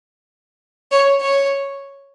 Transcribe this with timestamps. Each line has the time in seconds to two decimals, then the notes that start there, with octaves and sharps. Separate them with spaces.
0.91 C#5
1.20 C#5